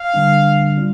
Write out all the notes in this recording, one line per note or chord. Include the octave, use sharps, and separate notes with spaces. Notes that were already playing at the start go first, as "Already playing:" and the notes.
Already playing: F5
D3 G3 D4
G3 C4 F4